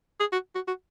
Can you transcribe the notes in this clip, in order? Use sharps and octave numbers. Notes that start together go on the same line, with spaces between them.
G#4
F#4
F#4
F#4